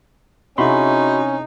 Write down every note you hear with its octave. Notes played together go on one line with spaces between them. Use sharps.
C3 C#4 D#4 E4 F#4 G#4 B5 C6